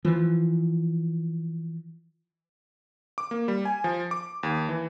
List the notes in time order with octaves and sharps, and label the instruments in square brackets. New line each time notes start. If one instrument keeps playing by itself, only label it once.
[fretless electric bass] E3 F3
[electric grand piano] D6
A#3
G3
G#5
F3
D6
D#2
E3